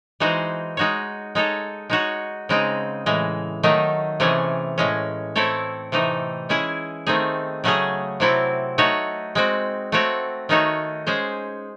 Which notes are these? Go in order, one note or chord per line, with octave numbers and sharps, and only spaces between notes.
E3 G#3 D#4 F#4 C5
G#3 D#4 F#4 C#5
G#3 D#4 A4 C#5
G#3 D#4 F#4 C#5
C#3 G#3 C4 D#4
A2 E3 G#3
D#3 F#3 A3 D#4
C3 E3 A3 C#4 G#4
A2 G#3 C#4
A3 C4 E4 A4 C#5
C3 E3 A3 D#4
G#3 C#4 E4 G#4
D#3 A3 C4 D#4 G#4
C#3 F#3 A3 C#4 G#4
C3 F#3 C4 E4 A4
A3 D#4 F#4 C#5
G#3 C4 F#4
A3 C4 F#4 C#5
D#3 A3 D#4 F#4 C#5
G#3 C#4 G#4 C5